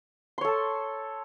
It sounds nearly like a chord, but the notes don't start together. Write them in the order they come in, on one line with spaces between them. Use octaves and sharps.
C6 C#5 A4 A5